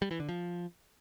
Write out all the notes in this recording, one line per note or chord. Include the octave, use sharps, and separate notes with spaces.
G3
E3
D3
F3